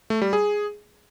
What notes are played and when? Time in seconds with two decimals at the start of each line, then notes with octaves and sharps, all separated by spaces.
0.10 A3
0.22 G3
0.33 G#4